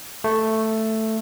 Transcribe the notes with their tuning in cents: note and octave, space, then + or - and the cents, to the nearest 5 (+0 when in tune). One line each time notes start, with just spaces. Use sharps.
A3 +5